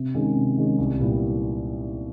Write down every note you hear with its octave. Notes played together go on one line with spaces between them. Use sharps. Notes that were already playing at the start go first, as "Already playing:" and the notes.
Already playing: C3
D#3 G#3 C#4
C3
D#3 G#3 C#4
C2
A#2 G3 B3 E4